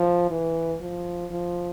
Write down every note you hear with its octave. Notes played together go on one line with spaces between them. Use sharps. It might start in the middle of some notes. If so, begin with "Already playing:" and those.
Already playing: F3
E3
F3
F3